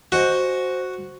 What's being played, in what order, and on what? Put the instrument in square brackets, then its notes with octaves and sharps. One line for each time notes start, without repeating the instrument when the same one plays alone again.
[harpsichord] F#4 [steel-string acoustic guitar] C5 D#5 G#5